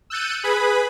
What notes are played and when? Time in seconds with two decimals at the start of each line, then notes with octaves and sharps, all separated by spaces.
0.10 E6 F#6 G6 A6 C#7 D#7
0.43 G#4 B4 G#5 B5 D#6